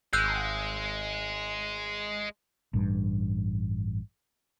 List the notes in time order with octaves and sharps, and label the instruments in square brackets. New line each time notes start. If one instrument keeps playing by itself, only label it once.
[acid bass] G#1 [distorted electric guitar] G#3 [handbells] E6 F#6 G6
[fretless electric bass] A1 G2